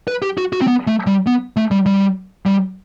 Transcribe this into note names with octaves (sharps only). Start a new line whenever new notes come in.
B4
G4
F#4
F#4
C4
B3
A3
G3
B3
A3
G3
G3
G3